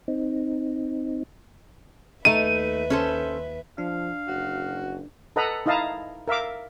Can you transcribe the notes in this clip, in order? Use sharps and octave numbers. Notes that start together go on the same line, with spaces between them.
C4 D#4
D#2 A3 D#4 B4 E5 D#7
C#4 A4 C5
F3 D4 F5
F#1 F#4
A4 B4 D#5 F#5 A#5 B5
D#4 E4 D#5 F5 A5 A#5
A#4 E5 F5 D6